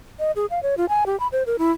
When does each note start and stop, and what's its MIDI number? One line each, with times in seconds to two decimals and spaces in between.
0.19 0.31 75
0.36 0.46 68
0.50 0.62 77
0.63 0.75 73
0.77 0.85 65
0.89 1.04 80
1.06 1.18 67
1.20 1.27 83
1.32 1.43 72
1.46 1.56 70
1.59 1.71 64